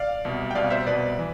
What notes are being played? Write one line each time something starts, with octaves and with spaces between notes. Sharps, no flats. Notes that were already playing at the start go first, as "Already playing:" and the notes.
Already playing: D5 F5
C2 B2
G5
C2 B2 D5 F5
C5 E5
C2 B2 B4 D5
E3